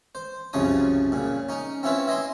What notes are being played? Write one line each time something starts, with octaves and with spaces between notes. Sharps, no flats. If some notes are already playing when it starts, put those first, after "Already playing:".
C5
C2 F#2 C#3 F3 C#5 D#6
A#2 C#3
C#4 D#4
C4 C#4 E4 F4 B4 C#5
E4 D#5 G#5 C6